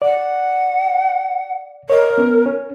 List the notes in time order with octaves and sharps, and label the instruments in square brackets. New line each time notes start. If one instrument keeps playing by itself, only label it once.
[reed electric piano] D5 [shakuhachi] F#5
[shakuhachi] A#4 [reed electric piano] C#5 D#5
[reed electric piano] B3 C#4
C#4